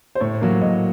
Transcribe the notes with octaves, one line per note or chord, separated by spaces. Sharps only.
C5
A2 C#5
F#3 A#3
A2 D#5